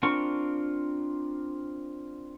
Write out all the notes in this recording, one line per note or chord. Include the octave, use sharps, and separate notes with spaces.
C4 D4 F4 A#4 C#6